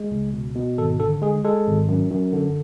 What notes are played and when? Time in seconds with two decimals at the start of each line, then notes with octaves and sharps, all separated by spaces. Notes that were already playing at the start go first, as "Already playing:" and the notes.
Already playing: G#3
0.11 C#2
0.33 B2
0.55 B2
0.78 G#1 A4
1.00 D3 A4
1.22 G#3 G#4
1.44 G#3 A4
1.67 G#1
1.88 F#2
2.12 F#2
2.33 D3